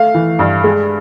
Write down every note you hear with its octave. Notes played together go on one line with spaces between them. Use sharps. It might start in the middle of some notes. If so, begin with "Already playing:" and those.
Already playing: A3 F5
E3
G2
G#3